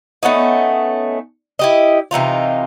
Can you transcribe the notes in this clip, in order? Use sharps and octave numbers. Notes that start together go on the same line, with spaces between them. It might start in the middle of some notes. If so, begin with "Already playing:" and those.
A3 B3 C#4 D#4
E4 G4 D#5
C3 E3 D#4 F4